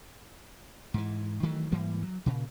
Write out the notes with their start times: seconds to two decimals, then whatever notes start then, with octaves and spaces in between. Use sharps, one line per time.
0.94 G#2 E3
1.43 D#3 E3 F#3 A3
1.72 G#2 E3 G3 A#3
2.03 F#3
2.26 A#2 C#3